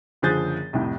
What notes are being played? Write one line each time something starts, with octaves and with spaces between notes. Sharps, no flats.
F#1 D3 F3 G#4 G6 A6
C2 F2 A2